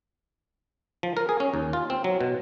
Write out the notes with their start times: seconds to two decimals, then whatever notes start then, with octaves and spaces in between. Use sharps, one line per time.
1.03 F3
1.17 A#4
1.29 G#4
1.40 C#4
1.54 D#2
1.73 F4
1.90 C4
2.04 F#3
2.21 B2